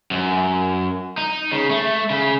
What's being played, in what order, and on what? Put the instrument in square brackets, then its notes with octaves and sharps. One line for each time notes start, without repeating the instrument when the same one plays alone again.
[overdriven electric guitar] F#2
D#4
C#3
A3
C#3